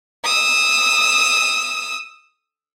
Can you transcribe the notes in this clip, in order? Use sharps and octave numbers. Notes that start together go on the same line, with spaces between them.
D#6 E6